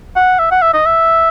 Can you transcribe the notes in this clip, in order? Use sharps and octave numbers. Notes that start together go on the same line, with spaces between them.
F#5
E5
F#5
E5
D#5
E5